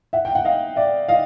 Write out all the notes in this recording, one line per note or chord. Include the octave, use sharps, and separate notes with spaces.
E5 F#5
G5
F#5
D#5 F5
D5 E5
D#5 F5